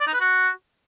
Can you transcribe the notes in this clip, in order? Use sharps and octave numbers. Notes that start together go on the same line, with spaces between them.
D5
D#4
B4
F#4